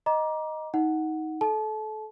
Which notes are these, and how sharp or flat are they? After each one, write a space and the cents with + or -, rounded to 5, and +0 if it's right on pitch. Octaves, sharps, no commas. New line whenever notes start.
D#5 +0 A#5 +25 D6 +0
D#4 +20 F#5 +0
A4 -25 A5 -30